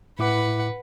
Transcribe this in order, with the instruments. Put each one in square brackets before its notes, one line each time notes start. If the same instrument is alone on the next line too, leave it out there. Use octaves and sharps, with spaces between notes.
[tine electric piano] A2 E4 D6 [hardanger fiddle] B4 F#5